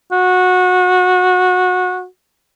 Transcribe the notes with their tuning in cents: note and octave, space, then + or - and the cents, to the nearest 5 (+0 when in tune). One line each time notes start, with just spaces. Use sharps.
F#4 -20